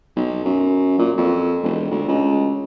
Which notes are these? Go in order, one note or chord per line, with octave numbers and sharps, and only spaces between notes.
B1
F#2
A#2
F2
E1
D2
C#2